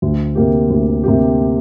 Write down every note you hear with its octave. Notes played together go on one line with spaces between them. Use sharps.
D2
C3 A#3 G4
D2
C3 A#3 G4